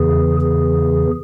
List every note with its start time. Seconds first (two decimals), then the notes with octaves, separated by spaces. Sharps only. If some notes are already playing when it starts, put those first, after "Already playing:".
Already playing: E2 C#3 E3 G#4
0.41 G#4